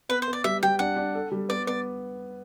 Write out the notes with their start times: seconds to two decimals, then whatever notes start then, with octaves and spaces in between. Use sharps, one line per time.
0.09 B3 B4
0.22 C5
0.28 B3
0.33 D5
0.44 G3 E5
0.63 G3 G5
0.79 D4 F#5
0.97 D4
1.15 A4
1.32 G3
1.49 B3 D5
1.67 B3 D5